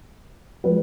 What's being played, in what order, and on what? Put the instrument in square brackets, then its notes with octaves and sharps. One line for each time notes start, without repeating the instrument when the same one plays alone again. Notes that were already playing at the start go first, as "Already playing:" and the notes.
[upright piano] F3 G#3 B4